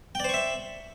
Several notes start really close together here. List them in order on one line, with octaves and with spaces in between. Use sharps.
G5 D5 C5 C#6 E5